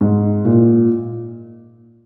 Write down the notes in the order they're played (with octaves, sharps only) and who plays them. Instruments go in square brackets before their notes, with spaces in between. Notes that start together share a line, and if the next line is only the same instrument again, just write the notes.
[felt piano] G#2
A#2